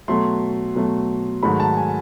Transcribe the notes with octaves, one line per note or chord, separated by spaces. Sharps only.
B2 F#3 A3 C6
B2 F#3 A3
G#2 D#3 F#3 A3 B5
A5
G#5